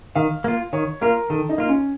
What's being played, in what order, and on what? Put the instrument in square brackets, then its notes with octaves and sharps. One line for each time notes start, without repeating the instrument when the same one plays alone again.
[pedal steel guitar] D#3 [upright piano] F5
[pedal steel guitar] A#3 F4
[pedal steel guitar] D#3 [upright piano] C#5
[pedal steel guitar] A#3 F4 [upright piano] A#4
[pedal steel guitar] D#3 [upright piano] A4
[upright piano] D#4
[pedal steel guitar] A#3 F4
[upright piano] C#4